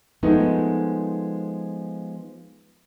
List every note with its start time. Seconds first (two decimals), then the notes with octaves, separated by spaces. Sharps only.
0.23 F3 G#3 A3 B3 D#4